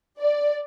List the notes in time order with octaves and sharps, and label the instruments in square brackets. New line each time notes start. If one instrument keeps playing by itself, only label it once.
[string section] D5